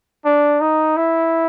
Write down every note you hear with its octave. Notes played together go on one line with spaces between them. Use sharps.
D4
D#4
E4